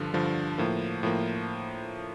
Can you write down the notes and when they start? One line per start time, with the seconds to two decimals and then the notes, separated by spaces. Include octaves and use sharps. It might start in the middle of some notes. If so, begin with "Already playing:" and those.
Already playing: G2 D3 F3
0.14 G2 D3 F3
0.58 A2 F3 A#3
1.03 A2 F3 A#3